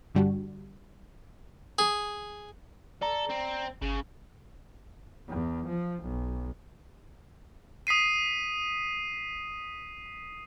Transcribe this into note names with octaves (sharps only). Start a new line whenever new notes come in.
G2 D3 G3 D4 F#4
G#4
A4 D5 A#5
C4
G1 C#3
E2
F3
B1
D#6 B6 C7 D#7